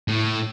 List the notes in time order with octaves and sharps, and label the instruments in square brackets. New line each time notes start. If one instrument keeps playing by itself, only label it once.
[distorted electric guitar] A2